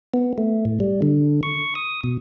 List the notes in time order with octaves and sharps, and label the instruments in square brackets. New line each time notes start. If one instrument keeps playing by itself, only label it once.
[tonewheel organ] B3
A3
A2
G3
D3
C#6
D#6
B2